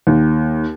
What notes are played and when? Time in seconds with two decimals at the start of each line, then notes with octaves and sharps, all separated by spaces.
0.07 D#2